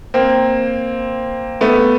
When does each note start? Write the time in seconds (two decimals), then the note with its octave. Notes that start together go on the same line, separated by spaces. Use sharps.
0.14 A#3 C4
1.61 A3 B3